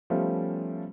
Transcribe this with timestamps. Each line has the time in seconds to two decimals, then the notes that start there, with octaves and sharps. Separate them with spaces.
0.10 F3 G3 A3 B3 C#4 F4